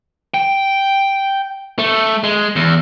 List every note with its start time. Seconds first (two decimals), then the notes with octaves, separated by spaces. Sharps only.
0.34 G5
1.79 A3
2.24 G#3
2.56 E2